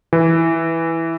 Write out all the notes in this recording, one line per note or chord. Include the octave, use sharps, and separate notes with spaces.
E3